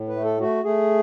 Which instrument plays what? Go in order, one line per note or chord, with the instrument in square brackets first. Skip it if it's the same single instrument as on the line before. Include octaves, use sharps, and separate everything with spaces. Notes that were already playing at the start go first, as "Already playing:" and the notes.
Already playing: [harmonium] A2
B4
A3
A4
A3 F#4
A3 G#4